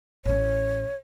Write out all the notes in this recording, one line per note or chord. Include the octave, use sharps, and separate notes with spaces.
A1 C#4 C#5